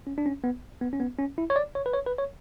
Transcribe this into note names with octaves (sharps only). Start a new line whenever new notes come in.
C#4
D4
C#4
B3
B3
C#4
B3
C#4
E4
C#5
D5
C#5
B4
C#5
B4
C#5